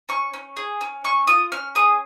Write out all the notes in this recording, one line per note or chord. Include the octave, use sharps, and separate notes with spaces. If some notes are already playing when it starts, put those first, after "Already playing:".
C#4 C#6
C#4
G#4
C#4
C#4 C#6
F4 D#6
C#4 F6
G#4 D#6